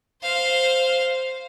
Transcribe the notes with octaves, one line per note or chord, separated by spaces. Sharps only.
C5 F5